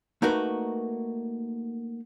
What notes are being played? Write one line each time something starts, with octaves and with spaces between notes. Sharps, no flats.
A3 A#3 D#4 F#4 A#4 B4